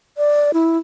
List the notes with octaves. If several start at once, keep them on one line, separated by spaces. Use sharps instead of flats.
D5
E4